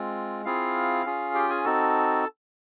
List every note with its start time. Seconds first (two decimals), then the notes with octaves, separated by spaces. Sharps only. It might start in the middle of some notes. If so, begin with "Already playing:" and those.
Already playing: G#3 C4 F4
0.45 C4 E4 F4 G#4 F5
1.06 C#4 F4 G#4
1.34 G4 G5
1.50 G#4 G#5
1.64 C4 D#4 F#4 A4 A5